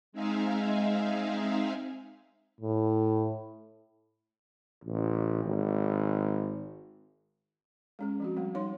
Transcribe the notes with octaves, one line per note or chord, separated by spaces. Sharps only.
G#3 C4 D#4 G#4 E5 F5
A2
A1
G#1
G#3 C#4 G#4
F3 C4 F#4
G3 A3 C4
G3 D#4 C#5 C6